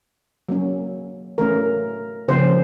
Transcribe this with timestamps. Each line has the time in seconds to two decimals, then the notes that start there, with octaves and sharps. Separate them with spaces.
0.49 F#3 A#3 C#4
1.38 E3 A3 C#4 A#4
2.28 C#3 F3 A#3 C#4 C5